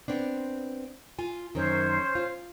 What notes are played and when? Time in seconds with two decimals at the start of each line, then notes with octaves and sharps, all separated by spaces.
0.08 B3 C4 D4
1.19 F4 G#5
1.55 F#2 D#3 C#4 C5
2.15 F4